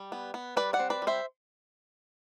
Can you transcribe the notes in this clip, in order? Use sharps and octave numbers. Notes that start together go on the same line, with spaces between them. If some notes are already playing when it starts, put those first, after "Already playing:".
Already playing: G3
B3
B3
G3 B4 D5
D5 F#5
C4
B4 D5
G3
C5 E5